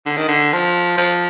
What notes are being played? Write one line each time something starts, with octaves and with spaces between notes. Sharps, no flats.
D3
D#3
D3
F3
F3